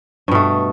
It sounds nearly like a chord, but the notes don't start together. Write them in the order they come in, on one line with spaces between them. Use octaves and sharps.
G2 B2 A3